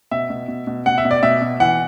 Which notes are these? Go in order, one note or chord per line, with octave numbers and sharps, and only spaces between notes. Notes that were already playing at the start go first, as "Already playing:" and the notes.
B2 E5
B2
B2
B2
B2 F#5
E5
B2
D5
B2 E5
B2
E3 F#5